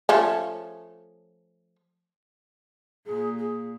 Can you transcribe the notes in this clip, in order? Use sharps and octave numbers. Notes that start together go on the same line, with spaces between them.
F3 A3 C#4
A#2 G#4
G#4